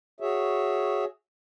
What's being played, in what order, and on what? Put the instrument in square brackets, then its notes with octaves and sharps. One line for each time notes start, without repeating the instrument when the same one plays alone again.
[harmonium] F#4 G#4 C#5 E5